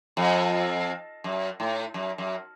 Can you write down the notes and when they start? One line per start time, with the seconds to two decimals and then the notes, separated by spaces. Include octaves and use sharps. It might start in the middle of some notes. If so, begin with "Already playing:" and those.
0.17 F2
1.24 F#2
1.60 A2
1.94 F#2
2.18 F#2